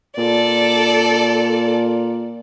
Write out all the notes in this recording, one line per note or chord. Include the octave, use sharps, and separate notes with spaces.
A#2 A4 D5